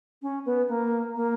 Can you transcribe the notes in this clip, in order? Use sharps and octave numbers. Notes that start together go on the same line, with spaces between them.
C#4
B3
A#3
A#3